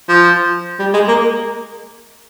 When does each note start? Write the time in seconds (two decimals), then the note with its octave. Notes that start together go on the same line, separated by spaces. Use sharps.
0.09 F3
0.79 G3
0.94 G#3
1.08 A#3